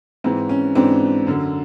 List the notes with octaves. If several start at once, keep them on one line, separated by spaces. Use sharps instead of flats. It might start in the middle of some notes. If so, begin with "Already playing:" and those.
G#2 E3 C4
C#4
G#2 E3 C4 D4
F#2 D3